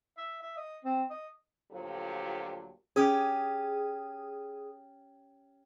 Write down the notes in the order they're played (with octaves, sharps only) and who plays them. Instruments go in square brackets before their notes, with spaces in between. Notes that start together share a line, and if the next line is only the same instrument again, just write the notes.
[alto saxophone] E5
E5
D#5
C4
D#5
[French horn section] D2 A#2 F3 F#3 G4 A4
[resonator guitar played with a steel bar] C#4 G4 [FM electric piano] G#4 D#6